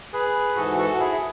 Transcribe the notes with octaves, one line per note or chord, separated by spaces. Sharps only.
G#4 B4
G#2 E3 F#4 A4
F#4 A4
E4 G#4